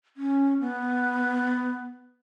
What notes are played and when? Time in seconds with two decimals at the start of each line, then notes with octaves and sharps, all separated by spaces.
0.17 C#4
0.60 B3